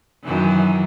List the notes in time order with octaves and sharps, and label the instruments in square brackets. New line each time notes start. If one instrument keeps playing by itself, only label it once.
[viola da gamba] F#2 D#3 E3